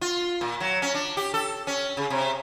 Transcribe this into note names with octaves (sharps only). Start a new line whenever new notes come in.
F4
A#2
F#3
C#4
D4
G4
A4
C#4
C#3
C3